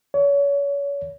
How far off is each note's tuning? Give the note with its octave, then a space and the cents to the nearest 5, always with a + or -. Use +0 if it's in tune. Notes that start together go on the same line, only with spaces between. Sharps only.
C#5 +30